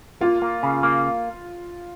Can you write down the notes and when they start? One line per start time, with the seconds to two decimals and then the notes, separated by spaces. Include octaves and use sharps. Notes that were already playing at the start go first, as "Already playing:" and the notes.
0.21 A#3 F4
0.42 A#3
0.63 C#3
0.83 A#3